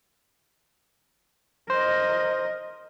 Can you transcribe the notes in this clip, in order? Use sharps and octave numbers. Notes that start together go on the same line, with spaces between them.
A#4 C5 D#5